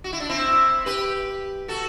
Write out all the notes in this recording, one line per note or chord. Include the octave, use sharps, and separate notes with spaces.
F#4
E4
D4
C4 E4
G4 B4
F#4 A4